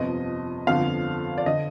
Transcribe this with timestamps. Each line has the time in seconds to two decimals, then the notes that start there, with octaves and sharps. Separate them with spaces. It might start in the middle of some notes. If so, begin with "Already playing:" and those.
Already playing: G1 F2 C3 F3 D#5
0.67 G1 F2 D3 F3 F5
1.38 D5
1.46 D3 D#5